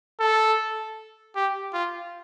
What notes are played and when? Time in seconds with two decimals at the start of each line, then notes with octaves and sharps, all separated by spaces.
0.20 A4
1.36 G4
1.73 F4